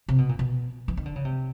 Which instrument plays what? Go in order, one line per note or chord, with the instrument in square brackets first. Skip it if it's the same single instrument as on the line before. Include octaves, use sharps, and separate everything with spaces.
[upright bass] C3
B2
A#2
B2
E3
D#3
D3
C#3
C3